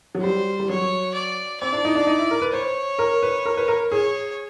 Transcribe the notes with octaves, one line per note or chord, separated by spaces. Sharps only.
F#3
G3 C5
G3
F#3 C#5
D5
C4 D5
D4
D#4
D4
D#4
E4
A#4
B4
C5 C#5
A#4
B4
A#4
B4
A#4
G#4 C#5